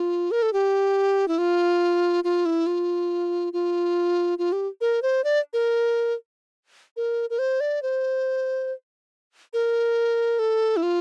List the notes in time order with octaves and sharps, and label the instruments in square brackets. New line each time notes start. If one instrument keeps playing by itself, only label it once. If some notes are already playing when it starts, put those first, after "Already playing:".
Already playing: [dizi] F4
A#4
A4
G4
E4
F4
F4
E4
F4
F4
F4
G4
A#4
C5
D5
A#4
A#4
A#4
C5
D5
C5
A#4
A4
E4
F4